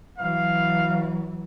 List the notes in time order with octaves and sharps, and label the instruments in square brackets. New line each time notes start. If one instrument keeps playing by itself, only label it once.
[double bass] E3 F#3 [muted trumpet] F5